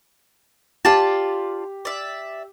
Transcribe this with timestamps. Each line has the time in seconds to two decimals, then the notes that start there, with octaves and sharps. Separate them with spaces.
0.85 F4 G4 D5 A5
1.85 D5 E5